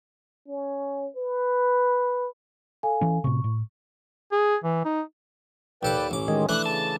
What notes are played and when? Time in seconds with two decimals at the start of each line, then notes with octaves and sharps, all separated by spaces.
0.48 C#4
1.16 B4
2.83 A4 F5 G#5
3.01 E3 C#4
3.24 A2 C3 C#6
3.44 A2
4.32 G#4
4.64 E3
4.85 D#4
5.83 D#2 A4 B4 D5 G5 D6
6.11 A1 C#4 D6
6.28 D#3 G#3
6.49 E3 A3 D4 F#6
6.66 C#3 A5